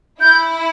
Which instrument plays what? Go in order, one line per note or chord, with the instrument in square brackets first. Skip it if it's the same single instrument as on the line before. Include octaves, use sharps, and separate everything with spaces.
[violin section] E4 [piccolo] G6